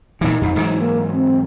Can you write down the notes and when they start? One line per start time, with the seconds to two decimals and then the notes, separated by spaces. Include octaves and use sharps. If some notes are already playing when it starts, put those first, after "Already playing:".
0.21 A#2 E3 D#4
0.41 F2
0.56 G#2 E3 F#3
0.79 A#3
1.11 C4